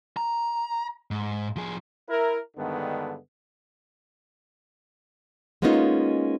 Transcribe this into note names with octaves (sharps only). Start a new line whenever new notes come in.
A#5
G#2
F3 G#4
E4 A#4
G2 D3 D#3 G#3 B3
G#3 A#3 B3 C#4 D#4 F4